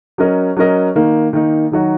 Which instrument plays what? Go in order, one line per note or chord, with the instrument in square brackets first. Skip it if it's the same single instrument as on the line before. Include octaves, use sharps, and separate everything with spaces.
[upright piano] F#3 C#4 A#4 D#5
F#3 C#4 A#4 D#5
D#3 A#3 D#4
D#3 A#3 D#4
D#3 F#3 D#4 F#4